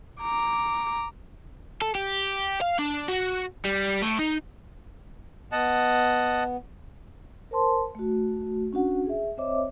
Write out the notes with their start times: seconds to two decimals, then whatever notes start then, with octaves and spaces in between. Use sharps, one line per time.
0.21 A#5 D6
1.82 A4
1.95 G4
2.61 F5
2.79 D4
3.08 F#4
3.65 G3
4.02 A2
4.19 D#4
5.52 B3 D#5 F#5 A5
7.51 A#4 C5 A5 C6
7.95 A3 F#4
8.73 C#4 D4 F#4 F#5
9.06 G#4 E5
9.37 C4 C5 C#5 D#5 E5 D6